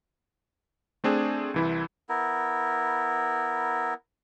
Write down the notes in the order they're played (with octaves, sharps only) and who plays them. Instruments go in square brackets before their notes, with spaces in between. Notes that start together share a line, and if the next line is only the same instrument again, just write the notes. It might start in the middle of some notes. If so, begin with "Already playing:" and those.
[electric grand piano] A3 C4 D4 G#4
C2 E3 E4
[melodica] B3 E4 A#4